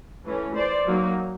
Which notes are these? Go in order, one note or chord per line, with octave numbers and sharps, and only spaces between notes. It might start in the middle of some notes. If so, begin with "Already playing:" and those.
E3 A3 C#4
C5 D5
F#3 A#3 D#4